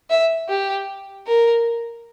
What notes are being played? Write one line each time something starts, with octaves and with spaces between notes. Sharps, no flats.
E5
G4
A#4